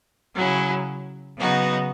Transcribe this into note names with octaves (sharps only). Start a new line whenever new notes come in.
C#3 F#3 C#4 E4
C#3 F#3 B3 D#4 F#4